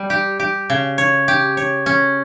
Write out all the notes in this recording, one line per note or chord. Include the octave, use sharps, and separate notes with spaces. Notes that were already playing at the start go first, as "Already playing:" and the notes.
Already playing: G3
G4
G4
C#3
C#5
G4
C#5
C#4